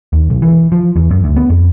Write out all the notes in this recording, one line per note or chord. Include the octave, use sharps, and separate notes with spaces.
D#2
B1
E3
F3
E2
F#2
D2
B3
F2